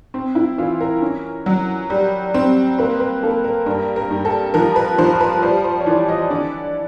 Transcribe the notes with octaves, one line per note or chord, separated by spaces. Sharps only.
C4
E4
E3 F4
A#4
C#4
F#3
G3
C4
A#3 B4
B4
A#3 A4
A#4
G2 A#4
A#4
G2
A4
F3 A#4
B4
F3 C5
C5
B4
G3 C5
C5
C#5
E3 D5
D#5
D3 D5